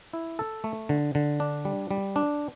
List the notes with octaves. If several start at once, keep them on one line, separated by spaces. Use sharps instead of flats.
E4
A4
A3
D3
D3
D4
G3
G3
D4